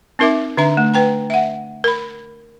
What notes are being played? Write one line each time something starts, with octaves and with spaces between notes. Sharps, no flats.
C4 D#4 A#4 E5 D6
D3 D4 E5 A#5
A3
B4 G5 A#5
E5 F#5
A#4 B5